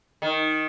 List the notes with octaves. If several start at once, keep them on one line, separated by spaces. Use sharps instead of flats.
D#3